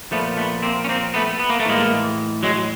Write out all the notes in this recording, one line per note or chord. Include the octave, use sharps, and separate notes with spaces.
A#2 F3 A3 B3
A3 B3
A#3 C4
C#4
A#3 C4
A3 B3
B3
A#3
A3
A2 E3 G#3 A#3
F#3 G#3